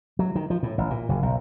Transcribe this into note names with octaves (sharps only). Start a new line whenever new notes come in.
F#3
D#3
F3
A2
A1
A#2
F#1
B1